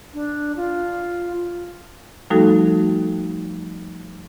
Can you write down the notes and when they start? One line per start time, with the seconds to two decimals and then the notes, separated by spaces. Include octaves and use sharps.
0.14 D4
0.56 F4
2.30 F3 G3 A3 D#4 F#4 A4